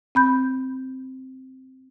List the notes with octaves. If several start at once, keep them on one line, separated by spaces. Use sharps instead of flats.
C4 B5 G6